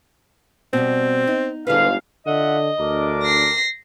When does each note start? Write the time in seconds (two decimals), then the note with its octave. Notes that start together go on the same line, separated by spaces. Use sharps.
0.73 B2 G3 C4
1.27 D#4
1.67 G1 G#2 D3 E4 B4 F5
2.27 D3 F4 D#5 E5 F#5
2.79 D2 D4 A#4 D6
3.23 A#6 C7